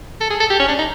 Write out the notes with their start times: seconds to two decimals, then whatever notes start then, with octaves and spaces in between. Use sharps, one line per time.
0.21 A4
0.30 G#4
0.40 A4
0.50 G4
0.60 C#4
0.68 D4
0.79 D#4